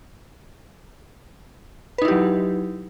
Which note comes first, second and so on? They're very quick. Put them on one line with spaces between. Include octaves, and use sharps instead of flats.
B4 D#4 E4 G4 F#3